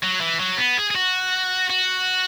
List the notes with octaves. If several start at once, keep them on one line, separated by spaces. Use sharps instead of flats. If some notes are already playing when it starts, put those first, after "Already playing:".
F#3
E3
F#3
B3
G#4
G#4
F#4
F#4